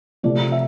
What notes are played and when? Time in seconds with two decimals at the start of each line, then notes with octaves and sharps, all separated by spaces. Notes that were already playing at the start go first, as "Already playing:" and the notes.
0.23 C3 F3 A3 D5
0.52 E5